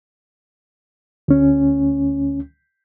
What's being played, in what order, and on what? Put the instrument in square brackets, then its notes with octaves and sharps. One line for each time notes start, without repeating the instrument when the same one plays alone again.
[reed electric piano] D2 C#4